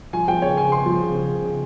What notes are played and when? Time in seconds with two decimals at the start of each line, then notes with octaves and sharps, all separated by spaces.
0.13 F3 G#5
0.28 F3 G5
0.42 C#3 C#5
0.57 C#3 G#5
0.72 C#3 C6
0.86 F3
1.01 C#3
1.15 C#3
1.30 C#3
1.45 C#3